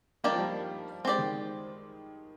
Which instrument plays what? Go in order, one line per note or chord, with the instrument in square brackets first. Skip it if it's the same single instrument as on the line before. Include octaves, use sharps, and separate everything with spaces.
[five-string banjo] D#3 A#3 D4 G4 D5 [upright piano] G3
[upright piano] F3
G3
[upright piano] G#3 [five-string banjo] C4 G4 D5
[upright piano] D#3